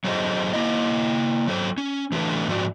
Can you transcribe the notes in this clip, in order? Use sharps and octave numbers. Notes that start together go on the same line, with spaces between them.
F#3 G#4 A4 C5 D#5
A#3 E4 D#5
F#3 A4 C5
C#4
E3 A3 D4 A4 B4
G#2 F3 F#4 D5